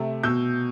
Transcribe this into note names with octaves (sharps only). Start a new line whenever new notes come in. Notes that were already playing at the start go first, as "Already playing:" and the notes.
Already playing: C3 A3
B2 E6 G6